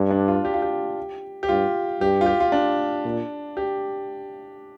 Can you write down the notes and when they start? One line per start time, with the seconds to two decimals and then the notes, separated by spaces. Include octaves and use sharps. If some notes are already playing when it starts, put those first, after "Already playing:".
Already playing: G2
0.11 D4
0.28 F4
0.45 G4
0.54 F4
0.62 G4
1.43 G4
1.49 G2 F4
2.01 G2 G4
2.21 F4
2.26 G4
2.40 F4
2.52 D4
3.05 A#2
3.57 G4